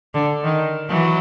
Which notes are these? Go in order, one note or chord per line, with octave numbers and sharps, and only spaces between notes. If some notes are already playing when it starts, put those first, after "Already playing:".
D3
D#3
E3 F#3